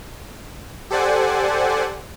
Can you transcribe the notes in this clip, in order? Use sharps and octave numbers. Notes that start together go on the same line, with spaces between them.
G4 A4 C5 D5 F#5 G#5